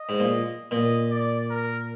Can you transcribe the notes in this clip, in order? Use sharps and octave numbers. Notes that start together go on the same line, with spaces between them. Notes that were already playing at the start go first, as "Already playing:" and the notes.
Already playing: D#5
G#2
A#2
A#2 D#5
D5
A#4